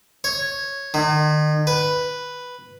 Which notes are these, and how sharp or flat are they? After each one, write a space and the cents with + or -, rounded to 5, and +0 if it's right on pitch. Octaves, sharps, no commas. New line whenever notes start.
C#5 -5
D#3 -40
B4 +0